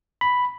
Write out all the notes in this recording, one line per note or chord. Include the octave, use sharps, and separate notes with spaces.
B5